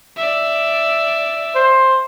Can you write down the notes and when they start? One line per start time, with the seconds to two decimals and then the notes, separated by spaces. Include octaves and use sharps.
0.16 D5 E5
1.55 C5